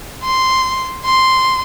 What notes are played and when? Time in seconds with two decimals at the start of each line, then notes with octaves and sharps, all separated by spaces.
0.23 C6
1.05 C6